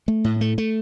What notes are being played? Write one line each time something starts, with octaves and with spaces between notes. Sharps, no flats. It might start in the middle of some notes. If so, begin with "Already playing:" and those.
A3
A2
A3
A3